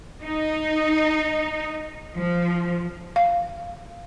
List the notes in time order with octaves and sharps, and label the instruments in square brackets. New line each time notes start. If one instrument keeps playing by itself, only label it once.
[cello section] D#4
F3
[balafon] F5